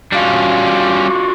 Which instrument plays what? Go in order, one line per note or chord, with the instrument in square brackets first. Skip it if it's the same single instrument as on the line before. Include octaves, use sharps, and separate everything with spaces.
[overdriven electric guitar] G3 C#4 [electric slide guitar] D4 F4 F#4